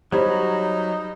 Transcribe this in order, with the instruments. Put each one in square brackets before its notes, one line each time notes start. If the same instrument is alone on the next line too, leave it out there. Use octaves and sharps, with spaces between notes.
[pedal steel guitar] F#3 C#5 B5 [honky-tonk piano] G3 [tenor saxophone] D#4 [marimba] C5